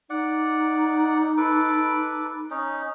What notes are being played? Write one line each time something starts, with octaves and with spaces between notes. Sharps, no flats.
D#4 D5 F#5
A4 B4 D6
C#4 D#4